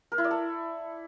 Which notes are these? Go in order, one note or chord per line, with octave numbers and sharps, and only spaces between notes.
A#4
E4
D5
A4